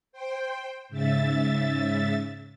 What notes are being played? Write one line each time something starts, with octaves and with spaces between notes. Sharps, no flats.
C5 G5
G#2 C#3 E5 A6